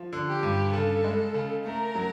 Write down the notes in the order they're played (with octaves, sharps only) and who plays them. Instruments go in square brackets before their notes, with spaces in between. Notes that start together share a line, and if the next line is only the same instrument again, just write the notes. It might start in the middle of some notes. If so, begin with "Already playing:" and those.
Already playing: [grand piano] F3
D3
[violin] G4
[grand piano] G2
[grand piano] C#3 [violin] A4
[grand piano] G#3
C#3
[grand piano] A3 [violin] A#4
[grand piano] F#3